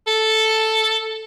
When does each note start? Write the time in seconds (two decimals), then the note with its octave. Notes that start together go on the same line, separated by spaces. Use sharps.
0.07 A4